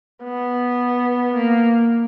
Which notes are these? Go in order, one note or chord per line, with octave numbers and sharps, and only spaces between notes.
B3
A#3